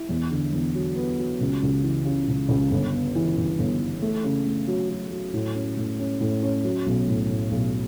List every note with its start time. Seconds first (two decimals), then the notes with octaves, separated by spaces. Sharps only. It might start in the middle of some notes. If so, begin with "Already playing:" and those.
Already playing: E4
0.09 E2
0.31 D3
0.52 E2
0.75 F#3
0.96 B3
1.19 F#3
1.41 C#2
1.62 C#2
1.83 E3
2.05 C#3
2.28 C#2
2.49 C#2
2.71 G1
2.94 B3
3.15 E3
3.37 G1
3.59 G1
3.81 E3
4.02 A3
4.24 C#3
4.46 A3
4.68 F#3
4.90 F#3
5.11 F#3
5.33 A2
5.55 C#4
5.77 A2
5.99 C#4
6.20 A2
6.43 C#4
6.65 F#3
6.86 B1
7.08 A2
7.30 A2
7.51 B1